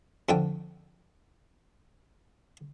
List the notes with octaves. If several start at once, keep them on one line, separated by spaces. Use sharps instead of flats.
F2 D3 G5